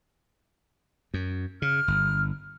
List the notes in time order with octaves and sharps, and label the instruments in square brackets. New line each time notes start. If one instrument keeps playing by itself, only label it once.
[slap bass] F#2
[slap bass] C#3 [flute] F6
[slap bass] G1